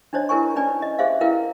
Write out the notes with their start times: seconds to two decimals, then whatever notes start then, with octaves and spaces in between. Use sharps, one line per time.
0.13 D4 D#4 C5 C#5 D#5
0.29 E4 A#4 B4 G#5 C#6
0.56 C#4 D#4 B4 D5 G#5
0.82 D#5
0.99 G#4 C5 E5 F5
1.21 E4 A#4 B4 F5 G5